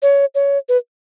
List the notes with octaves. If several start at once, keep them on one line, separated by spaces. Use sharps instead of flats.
C#5
C#5
B4